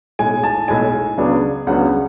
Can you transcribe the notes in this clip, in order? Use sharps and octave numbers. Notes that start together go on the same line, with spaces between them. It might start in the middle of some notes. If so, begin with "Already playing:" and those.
B1 A2 G#3 G#5
A5
B1 A2 G#3 G#5
C#2 C#3 F#3 B3 D4
C#2 C#3 F#3 B3 D4 F#5